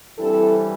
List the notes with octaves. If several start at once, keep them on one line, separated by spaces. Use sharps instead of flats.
G2 E3 G3 C4 E4 A4